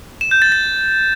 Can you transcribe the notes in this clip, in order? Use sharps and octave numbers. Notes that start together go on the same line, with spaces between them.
E7
G6
A6
A6